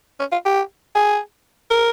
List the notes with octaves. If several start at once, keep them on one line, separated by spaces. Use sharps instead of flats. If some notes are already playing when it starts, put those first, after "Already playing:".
C#4
F4
G4
G#4
A#4